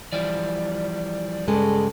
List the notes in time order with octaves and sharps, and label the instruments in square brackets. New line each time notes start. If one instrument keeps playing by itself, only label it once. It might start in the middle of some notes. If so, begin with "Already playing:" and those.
[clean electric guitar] E3 F3 G3 [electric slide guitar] D5
[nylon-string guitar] G2 G#3 [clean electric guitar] C#3 [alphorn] A4